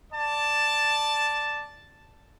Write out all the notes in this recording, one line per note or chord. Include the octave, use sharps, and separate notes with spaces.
D5 A5